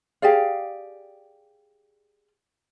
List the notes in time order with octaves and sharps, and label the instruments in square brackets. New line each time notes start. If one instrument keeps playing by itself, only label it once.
[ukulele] G4 G#4 D5 F5